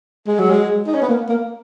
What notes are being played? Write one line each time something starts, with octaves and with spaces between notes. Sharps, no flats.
G#3
F#3
G#3
D#4
C#4
B3
A#3
A#3